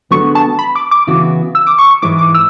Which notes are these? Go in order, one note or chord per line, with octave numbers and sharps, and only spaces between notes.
D3 G#3 B3 F#4 C#6
A5
B5
D6
D6
C#3 E3 B3 F#4
E6
D6
C#6
C#6
G#2 E3 G#3 D6
D6
E6